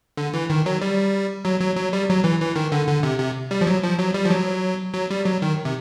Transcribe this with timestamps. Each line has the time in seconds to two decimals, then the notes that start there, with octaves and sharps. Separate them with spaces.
0.17 D3
0.34 E3
0.50 D#3
0.66 F#3
0.81 G3
1.45 F#3
1.60 F#3
1.77 F#3
1.93 G3
2.09 F#3
2.24 E3
2.41 E3
2.56 D#3
2.72 D3
2.88 D3
3.03 C3
3.19 C3
3.51 G3
3.61 F3
3.67 F#3
3.83 F3
3.99 F#3
4.14 G3
4.25 F3
4.30 F#3
4.94 F#3
5.10 G3
5.26 F#3
5.42 D#3
5.65 C3